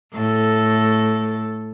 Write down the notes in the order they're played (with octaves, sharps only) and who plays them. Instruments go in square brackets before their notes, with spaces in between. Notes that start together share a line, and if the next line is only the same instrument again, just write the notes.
[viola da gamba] A2 A4